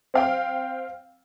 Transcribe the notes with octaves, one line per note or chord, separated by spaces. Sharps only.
C4 F5 G5